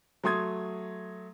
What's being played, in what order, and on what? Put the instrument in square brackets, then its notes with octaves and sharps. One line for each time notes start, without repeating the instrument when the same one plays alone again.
[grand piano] F#3 A3 C6 D#6 G#6